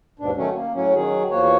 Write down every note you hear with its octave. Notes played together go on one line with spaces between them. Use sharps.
D#2 G#2 B2 D4
D#3 F#3 A3 C#4
A#3
A2 F#3 C#4
D#3 F#3 G#4
E2 F3 A#3 F#4 C#5